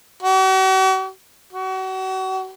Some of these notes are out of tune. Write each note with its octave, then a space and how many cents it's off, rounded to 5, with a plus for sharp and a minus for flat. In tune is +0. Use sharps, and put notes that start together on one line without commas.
F#4 +45
F#4 +35